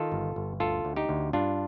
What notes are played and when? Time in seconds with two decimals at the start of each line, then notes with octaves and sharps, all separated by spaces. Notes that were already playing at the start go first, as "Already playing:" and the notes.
Already playing: D#3 F4 A4
0.12 G1
0.36 G1
0.60 D2 F4 A4
0.85 D2
0.96 D#4 G4
1.09 D2
1.33 G2 D4 F4